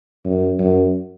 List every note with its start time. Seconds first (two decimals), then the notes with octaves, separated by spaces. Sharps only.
0.25 F#2
0.59 F#2